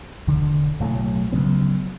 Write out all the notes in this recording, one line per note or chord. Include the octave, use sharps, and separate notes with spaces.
E1 D2 D3
B1 A2 F#3 A3
D2 C#3 F#3 B3